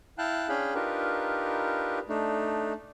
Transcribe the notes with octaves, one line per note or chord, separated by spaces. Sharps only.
E4 F5 G5 A5 F#6
C#4 D4 G#4 F5 G5 B5
D4 D#4 F4 G4 A#4 B4
A3 D4 D#4